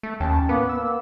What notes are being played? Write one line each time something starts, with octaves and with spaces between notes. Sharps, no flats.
A3
D#2 C#4 G5 A5
A2 A#3 B3 B4
A#3 B4 E6